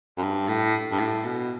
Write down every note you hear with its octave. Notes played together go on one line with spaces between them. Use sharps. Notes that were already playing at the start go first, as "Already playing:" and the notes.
F#2
G2
A2
G2
A2
B2